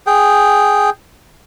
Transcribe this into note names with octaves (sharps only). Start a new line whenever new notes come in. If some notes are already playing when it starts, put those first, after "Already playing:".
G#4 G5